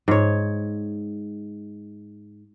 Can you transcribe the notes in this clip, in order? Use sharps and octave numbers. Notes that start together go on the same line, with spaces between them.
G#2 C#5